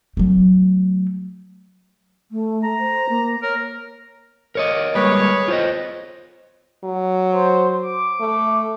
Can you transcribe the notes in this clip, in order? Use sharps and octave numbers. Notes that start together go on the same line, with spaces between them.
F#3 A3
A3
A#5
C5
A#3
A#4 C#5
A#4 C#5 D#5
G3 G#3 A#3 G#4 B4 C#5
F4 C5 D#5
F#3
C5
D6
A3